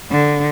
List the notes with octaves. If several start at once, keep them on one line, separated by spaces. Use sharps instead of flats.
D3